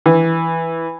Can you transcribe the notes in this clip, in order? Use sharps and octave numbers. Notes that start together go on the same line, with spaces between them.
E3